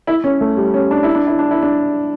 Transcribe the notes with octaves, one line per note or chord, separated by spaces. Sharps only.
E4
C#4
A3
G3
C#4
D4
E4
D4
E4
D4
E4
D4